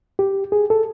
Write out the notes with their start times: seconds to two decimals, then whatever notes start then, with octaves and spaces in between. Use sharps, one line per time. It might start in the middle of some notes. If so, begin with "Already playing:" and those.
0.19 G4
0.52 G#4
0.70 A4